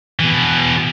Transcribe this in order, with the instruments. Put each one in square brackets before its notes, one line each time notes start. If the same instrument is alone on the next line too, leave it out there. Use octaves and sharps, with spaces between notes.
[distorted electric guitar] B2 E3